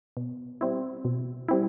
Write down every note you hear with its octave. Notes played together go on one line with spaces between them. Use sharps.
B2
G3 C4 E4
B2
G3 C4 E4